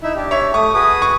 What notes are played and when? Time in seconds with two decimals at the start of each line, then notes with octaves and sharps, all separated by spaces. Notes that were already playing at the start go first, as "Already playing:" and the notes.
0.03 D#4 E4 E5
0.16 D4 G4
0.31 C#5 E5
0.54 A3 C#6 D#6
0.74 F#4 G#4 B4 D#6
1.02 C#6